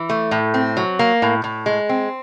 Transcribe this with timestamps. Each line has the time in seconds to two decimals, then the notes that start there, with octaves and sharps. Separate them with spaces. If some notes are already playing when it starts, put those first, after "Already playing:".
Already playing: E3
0.10 A3
0.31 A2
0.54 C4
0.77 F#3
0.99 A#3
1.22 A2
1.44 A2
1.66 G#3
1.89 C4